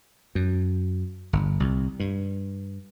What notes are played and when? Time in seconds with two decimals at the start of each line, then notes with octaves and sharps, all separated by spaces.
0.35 F#2
1.33 G1
1.60 C2
2.00 G2